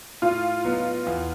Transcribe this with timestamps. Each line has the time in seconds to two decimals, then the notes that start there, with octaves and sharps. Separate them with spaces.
0.22 A2 F4
0.64 F#3 B3 D#4
1.07 E2